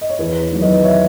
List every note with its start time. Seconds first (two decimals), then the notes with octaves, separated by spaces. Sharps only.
0.01 D#5
0.10 C#5
0.19 E2 B4
0.41 C#5
0.52 D#3 F#3
0.62 B4 D#5
0.84 C#5 E5